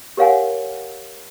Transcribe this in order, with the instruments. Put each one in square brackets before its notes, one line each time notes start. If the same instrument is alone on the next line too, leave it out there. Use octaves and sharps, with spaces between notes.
[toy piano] G4 A#4 C#5 F5 F#5 G#5